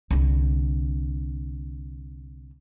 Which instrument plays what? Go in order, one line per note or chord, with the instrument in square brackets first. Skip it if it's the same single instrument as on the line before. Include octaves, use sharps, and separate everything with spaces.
[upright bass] C2 D3